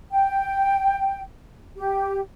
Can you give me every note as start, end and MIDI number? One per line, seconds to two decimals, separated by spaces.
0.11 1.22 79
1.77 2.20 67